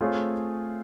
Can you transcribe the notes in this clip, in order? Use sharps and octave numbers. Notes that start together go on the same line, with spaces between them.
A3 C4 F4 G#4 C#5